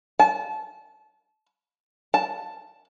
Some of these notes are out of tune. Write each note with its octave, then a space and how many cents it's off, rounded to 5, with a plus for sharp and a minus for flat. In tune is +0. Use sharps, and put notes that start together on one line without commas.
A5 -25
A5 +5